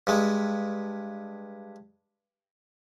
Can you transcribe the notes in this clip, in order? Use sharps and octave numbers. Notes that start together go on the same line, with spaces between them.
G2 G#3